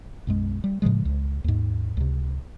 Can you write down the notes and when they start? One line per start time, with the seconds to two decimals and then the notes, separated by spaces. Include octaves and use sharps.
0.27 B1 F#2 G#3
0.64 G3
0.82 A2 C#3 F3 G#3
1.05 C#2
1.44 D#2 G#2
1.97 C#2 C3